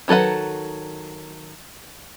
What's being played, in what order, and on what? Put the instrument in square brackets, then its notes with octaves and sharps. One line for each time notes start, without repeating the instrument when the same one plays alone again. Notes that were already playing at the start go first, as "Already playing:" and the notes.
[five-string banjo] D#3 F#3 A4 B4 F#5